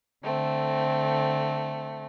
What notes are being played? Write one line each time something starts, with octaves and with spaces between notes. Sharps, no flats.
D3 A3 C4